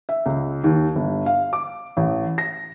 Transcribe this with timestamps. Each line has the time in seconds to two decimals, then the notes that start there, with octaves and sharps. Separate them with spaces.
0.09 E5
0.26 C#2
0.64 D#2
0.95 G1
1.26 F5
1.53 D6
1.97 A1
2.38 A#6